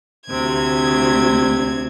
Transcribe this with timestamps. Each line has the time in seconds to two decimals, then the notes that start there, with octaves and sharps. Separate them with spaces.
0.27 D2 C3 G#6